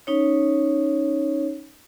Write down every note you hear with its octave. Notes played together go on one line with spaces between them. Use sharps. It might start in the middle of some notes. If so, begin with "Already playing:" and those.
C#4 D#4 C#5